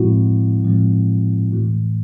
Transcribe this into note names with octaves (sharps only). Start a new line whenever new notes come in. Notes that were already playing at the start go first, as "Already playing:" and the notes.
Already playing: A2 F3 G#3 C4 E4 F#4
A2 F3 G#3 C4
A2 E3 A3